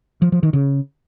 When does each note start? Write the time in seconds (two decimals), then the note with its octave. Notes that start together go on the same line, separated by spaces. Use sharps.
0.22 F3
0.32 F3
0.43 D#3
0.53 C#3